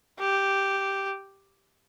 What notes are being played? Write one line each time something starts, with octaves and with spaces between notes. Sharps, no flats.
G4